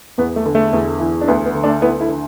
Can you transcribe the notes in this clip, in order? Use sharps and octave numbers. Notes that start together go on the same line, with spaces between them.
E2 B3
A3
D3
A3
E2
E3
D4
D2 B3
B3
D3
A3 D4
D2 B3 E4
E4 A4
D3